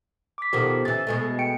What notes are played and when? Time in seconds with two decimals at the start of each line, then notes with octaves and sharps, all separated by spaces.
0.38 D6 B6
0.53 B2 D#3 F3 G4 A4
0.85 C#3 E3 A6
1.07 B2 G#3 A3
1.39 G5 C#7 D7